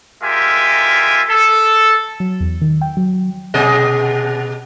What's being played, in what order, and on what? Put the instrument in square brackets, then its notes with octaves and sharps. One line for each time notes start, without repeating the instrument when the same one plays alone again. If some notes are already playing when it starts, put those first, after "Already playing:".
[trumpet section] G#3 F4 G4 A#4 E5 G#5
A4
[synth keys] F#3
E2
D#3
G5
F#3
[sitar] B2 G#4 D#5